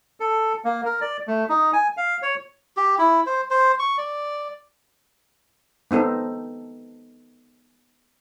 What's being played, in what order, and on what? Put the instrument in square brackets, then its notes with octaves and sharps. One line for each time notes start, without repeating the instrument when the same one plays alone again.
[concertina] A4
A#3
A#4
D5
A3
D#4
G#5
F5
C#5
[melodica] G4
E4
C5
C5
C#6
D5
[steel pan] B3 C4 D#4 A4